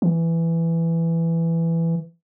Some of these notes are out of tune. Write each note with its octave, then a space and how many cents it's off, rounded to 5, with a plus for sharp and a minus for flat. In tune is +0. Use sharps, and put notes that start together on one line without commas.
E3 +10